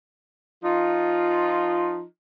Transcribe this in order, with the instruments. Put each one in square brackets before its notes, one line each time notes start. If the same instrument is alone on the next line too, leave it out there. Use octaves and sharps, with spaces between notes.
[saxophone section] F3 D#4 F4